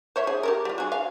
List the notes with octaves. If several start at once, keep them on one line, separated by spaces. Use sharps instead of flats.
C5 C#5 E5
G#4
G4 A4 A#4
G3 F4
F#4 G#4
F5